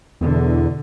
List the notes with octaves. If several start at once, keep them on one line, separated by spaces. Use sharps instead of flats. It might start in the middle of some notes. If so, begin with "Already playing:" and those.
E2 B2 D3